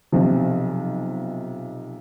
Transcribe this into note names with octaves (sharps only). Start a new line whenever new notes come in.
B1 C3 F3